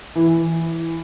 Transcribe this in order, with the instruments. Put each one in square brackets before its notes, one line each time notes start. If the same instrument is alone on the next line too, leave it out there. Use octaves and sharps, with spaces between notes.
[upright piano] E3